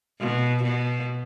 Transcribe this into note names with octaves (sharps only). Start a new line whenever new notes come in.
B2
B2